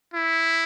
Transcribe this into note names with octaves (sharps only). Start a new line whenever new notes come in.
E4